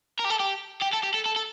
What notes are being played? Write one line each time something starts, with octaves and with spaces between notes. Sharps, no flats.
A#4
G4
A4
G4
G4
A4
G4
A4
A4
A4